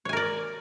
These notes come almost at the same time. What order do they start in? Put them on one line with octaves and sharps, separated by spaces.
C#5 G#5 A#4 D5